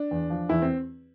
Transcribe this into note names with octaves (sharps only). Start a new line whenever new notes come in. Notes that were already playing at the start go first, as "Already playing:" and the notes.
Already playing: D4
E2
F3
E2 E4
C4